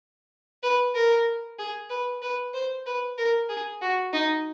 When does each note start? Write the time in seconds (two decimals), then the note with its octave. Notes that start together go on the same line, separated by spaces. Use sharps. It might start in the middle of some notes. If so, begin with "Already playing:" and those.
0.63 B4
0.95 A#4
1.59 G#4
1.90 B4
2.22 B4
2.54 C5
2.86 B4
3.18 A#4
3.49 G#4
3.82 F#4
4.13 D#4